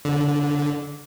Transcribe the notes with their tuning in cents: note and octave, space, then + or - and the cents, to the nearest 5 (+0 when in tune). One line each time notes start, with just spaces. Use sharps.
D3 -15